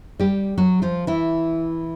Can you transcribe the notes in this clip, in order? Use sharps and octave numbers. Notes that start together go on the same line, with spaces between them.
G3 G4
F#3 F#4
F3 F4
E3 E4